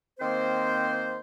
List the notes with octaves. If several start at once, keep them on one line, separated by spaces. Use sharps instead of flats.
D#3 A#3 C4 C5